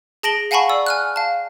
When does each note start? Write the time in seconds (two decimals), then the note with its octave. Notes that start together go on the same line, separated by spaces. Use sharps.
0.23 G#4 A5 A#6 D7 F#7 G7
0.51 F5 F#5 G#5 A5 B5 C#6
0.70 D5 E6
0.86 G#5 F6 F#6
1.16 F5 A5